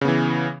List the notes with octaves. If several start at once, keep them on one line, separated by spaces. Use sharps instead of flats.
C#3 E3 B3